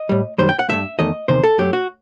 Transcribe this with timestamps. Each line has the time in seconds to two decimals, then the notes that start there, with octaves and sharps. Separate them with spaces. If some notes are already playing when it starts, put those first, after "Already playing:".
Already playing: D#5
0.09 A2 G3
0.38 F#2 D#3 G3 C5
0.49 G5
0.59 F#5
0.69 G2 F#3 A3 E5
0.99 E2 D#3 A3 D#5
1.28 E2 C3 D#3 C5
1.44 A4
1.58 F#2 F#3 A3 G4
1.73 F#4